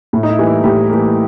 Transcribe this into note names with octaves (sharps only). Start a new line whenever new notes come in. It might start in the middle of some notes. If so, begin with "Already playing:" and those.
A2 E4
D#4
E4
E3 G3 A#3
E4
A2 G4
E3 G3 A#3